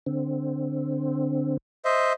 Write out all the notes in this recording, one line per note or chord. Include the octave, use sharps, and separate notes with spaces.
D3 C4
C5 D#5 E5